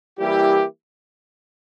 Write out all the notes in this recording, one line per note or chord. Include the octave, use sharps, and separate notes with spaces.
E3 G3 A#3 E4 G4